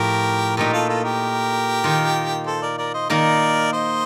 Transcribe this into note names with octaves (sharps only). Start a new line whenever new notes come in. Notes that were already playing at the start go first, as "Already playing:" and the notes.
Already playing: A2 F3 A3 G4 A#4
A#2 A3 D#4 G4 A#4
F4 A4
F4 A4
G4 A#4
D#3 A#3 F4
A4 C5
A#4 D5
A#4 D5
C5 D#5
D#3 A#3 D#4 A#4 D5
C5 D#5